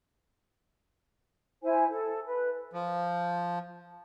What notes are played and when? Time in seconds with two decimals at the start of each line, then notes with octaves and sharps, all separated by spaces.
1.62 E4 C5 G#5
1.88 A4
2.26 B4
2.73 F3